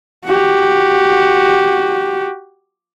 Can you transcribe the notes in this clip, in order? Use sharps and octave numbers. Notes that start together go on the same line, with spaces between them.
F#4 G4